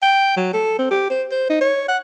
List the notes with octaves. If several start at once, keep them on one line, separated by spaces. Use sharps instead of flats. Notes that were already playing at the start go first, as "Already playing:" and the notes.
G5
F#3
A4
C4
G4
C5
C5
D#4
C#5
F#5